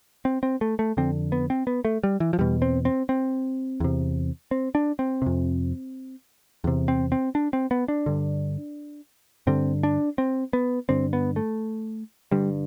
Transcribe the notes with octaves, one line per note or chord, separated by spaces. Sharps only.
C4
C4
A3
A3
F2 D3 C4
B3
C4
B3
A3
G3
E3
F3
E2 B2 G3
C4
C4
C4
E2 C3
C4
D4
C4
F2 C3
E2 C3
C4
C4
D4
C4
B3
D4
G2 D3
G2 D3 C4
D4
C4
B3
G2 D3 C4
B3
A3
G2 D3 G3